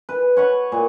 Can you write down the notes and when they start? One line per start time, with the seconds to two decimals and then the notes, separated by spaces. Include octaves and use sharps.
0.09 B4
0.37 C#5 F#5 B5
0.72 A#2